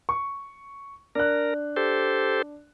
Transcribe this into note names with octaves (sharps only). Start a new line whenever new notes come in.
C#6
D4 A#4 F#6
G4 A4 C5